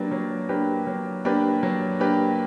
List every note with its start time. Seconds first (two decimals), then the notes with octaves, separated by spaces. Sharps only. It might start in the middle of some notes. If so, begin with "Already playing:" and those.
Already playing: F#3 A#3 D4 G4 B4
0.11 F#3
0.49 A#3 D4 G4 B4
0.87 F#3
1.25 A#3 D4 G4 B4
1.63 F#3
2.00 A#3 D4 G4 B4